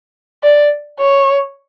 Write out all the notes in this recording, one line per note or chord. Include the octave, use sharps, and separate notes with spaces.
D5
C#5